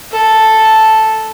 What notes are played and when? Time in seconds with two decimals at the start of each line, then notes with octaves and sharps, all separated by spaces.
0.12 A4